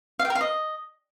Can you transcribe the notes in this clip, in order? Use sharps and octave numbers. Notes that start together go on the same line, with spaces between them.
F5
G5
A#4
F5
D#5